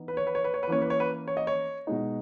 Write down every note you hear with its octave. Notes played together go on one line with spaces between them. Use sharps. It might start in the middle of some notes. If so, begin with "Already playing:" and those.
Already playing: E3 B3 D#4
B4
C#5
B4
C#5
B4
C#5
B4
E3 A#3 C#4 C#5
B4
C#5
B4
C#5
D#5
C#5
B2 G#3 D#4